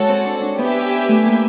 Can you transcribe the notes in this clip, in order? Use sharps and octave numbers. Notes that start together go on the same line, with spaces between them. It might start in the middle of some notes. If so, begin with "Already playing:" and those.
Already playing: G#3 F#4 A4 C#5 F#5
C4
D4
D4
B3 G4 B4 E5 G#5
A3
A#3